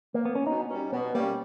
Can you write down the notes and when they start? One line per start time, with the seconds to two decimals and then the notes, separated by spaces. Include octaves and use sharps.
0.14 A#3
0.25 B3
0.35 C#4
0.47 B2 D#4
0.70 G3 C#4
0.92 B2 B3
1.14 G3 A#3
1.18 C#4